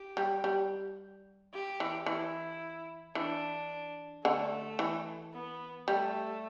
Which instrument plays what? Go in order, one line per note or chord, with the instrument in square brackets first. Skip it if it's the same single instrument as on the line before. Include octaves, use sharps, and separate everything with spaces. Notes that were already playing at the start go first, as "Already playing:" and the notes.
Already playing: [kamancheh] G4
[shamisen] G3
G3
[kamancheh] G4
[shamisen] E3
[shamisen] E3 [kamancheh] E4
[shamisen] E3 [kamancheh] D4
[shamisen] D3 [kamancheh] A3
[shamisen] E3
[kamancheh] B3
[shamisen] G3 [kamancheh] A3